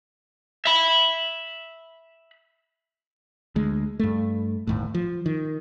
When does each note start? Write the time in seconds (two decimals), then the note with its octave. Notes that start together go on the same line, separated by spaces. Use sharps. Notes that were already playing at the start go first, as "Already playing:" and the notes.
0.66 E5 B5
3.56 D2 G#3
3.99 G2 A3
4.67 G1 D#2 A2
4.94 F3
5.26 D#3